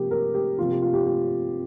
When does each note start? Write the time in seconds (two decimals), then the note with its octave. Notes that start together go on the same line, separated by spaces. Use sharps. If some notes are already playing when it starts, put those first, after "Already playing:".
Already playing: C3 F3 A#3 G4
0.11 A#4
0.34 G4
0.58 C3 F3 A#3 F4
0.70 G4
0.82 F4
0.93 G4
1.06 G4